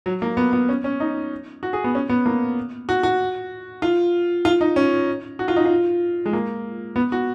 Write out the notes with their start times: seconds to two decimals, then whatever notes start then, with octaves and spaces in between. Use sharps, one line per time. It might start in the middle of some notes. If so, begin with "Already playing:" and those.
0.06 F#3
0.22 A#3
0.37 B3
0.53 B3
0.69 C#4
0.84 C#4
1.00 D#4
1.63 F#4
1.73 G#4
1.84 B3
1.95 C#4
2.09 B3
2.26 A#3
2.89 F#4
3.03 F#4
3.82 F4
4.45 F4
4.61 D#4
4.76 C#4
5.39 F#4
5.48 F4
5.56 D#4
5.65 F4
6.26 G#3
6.33 A#3
6.96 B3
7.12 F#4